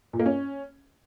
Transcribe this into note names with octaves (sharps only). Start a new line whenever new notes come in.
A#2
A#3
C#4